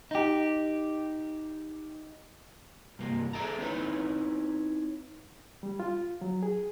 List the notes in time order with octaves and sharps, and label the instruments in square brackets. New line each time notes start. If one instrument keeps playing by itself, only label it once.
[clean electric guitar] D#4 G4
[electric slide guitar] G2 C3 A#3
G#4 A4 D5 E5 A5 A#5
C4 D#4 E4 A#4 B4 C#5
[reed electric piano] G3
F4
F#3
G#4